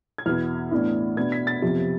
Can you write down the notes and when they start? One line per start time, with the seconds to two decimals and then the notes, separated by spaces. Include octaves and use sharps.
0.18 G#6
0.26 E2 B2 B3 F6
0.71 A2 E3 B3 D4
1.17 B2 B3 D4 G#6
1.32 B6
1.47 A6
1.62 F2 C3 F3 B3